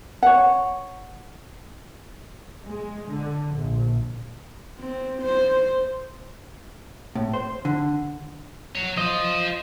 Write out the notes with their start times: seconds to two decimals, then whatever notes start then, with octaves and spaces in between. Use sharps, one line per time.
0.23 C#5 F#5
2.64 G#3
3.09 D3
3.50 A#1
4.79 C4
5.22 C5
7.15 A2
7.34 C5
7.65 D3
8.76 F#3 C#5
8.97 F4 C5 D#5